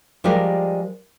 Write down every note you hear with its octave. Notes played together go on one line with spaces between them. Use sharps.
F3 G3 G#3 G4 A#4 D5